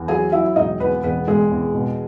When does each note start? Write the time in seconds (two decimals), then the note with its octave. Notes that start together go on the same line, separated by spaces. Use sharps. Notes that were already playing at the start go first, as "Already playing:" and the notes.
Already playing: E2
0.08 F#3 G#4 G#5
0.32 F#3 E4 E5
0.56 E1 D#4 D#5
0.80 E2 B3 B4
1.03 E1 B3 B4
1.27 E1 G#3 G#4
1.51 E2
1.74 B2